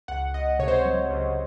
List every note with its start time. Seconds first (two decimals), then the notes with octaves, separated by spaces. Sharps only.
0.08 C#2 F#5
0.34 C#2 D#5
0.59 C3 C#5
0.68 C5
0.76 C#5
0.85 F#3
1.11 C#2